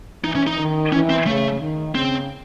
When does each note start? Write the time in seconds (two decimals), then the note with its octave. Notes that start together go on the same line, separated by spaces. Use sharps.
0.24 E3 D#4
0.36 C#4
0.47 D#4
0.58 D#3
0.92 E3 C#4
1.10 C4
1.26 C#3 A3
1.60 D#3
1.95 C#3 C4